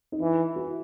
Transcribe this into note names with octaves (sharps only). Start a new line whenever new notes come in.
D#4
E3 E4
F#4